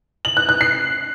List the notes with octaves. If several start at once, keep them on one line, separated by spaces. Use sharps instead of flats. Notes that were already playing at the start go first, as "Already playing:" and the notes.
F#7
F#6
F#6
C7